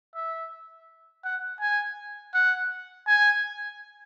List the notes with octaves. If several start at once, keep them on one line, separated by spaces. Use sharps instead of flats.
E5
F#5
G#5
F#5
G#5